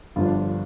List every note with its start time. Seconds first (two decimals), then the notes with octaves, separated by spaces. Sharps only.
0.16 G1 G2 D3 F3 F4
0.25 D4
0.36 F4